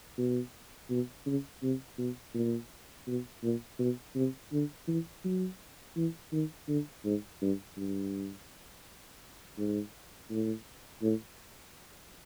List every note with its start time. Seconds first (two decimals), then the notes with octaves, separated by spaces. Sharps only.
0.18 B2
0.90 B2
1.26 C#3
1.63 C3
1.98 B2
2.34 A#2
3.07 B2
3.43 A#2
3.79 B2
4.15 C3
4.52 D3
4.87 E3
5.24 F#3
5.96 E3
6.32 D#3
6.68 D3
7.04 G#2
7.41 G2
7.77 G2
9.58 G#2
10.30 A2
11.02 A2